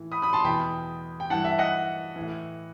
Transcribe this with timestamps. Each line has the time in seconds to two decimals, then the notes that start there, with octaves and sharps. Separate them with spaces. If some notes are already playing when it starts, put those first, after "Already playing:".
Already playing: A2 E3
0.12 B5 D#6
0.22 B5 D#6
0.33 A5 C6
0.44 E2 B2 G5 B5
1.20 G5
1.30 G2 E3 F#5 A5
1.44 E5
1.58 D#5 F#5
2.16 A2 E3